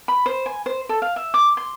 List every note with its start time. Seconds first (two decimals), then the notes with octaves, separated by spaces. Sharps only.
0.08 B5
0.26 C5
0.46 G#5
0.66 C5
0.89 A4
1.02 F5
1.16 E5
1.34 D6
1.57 C6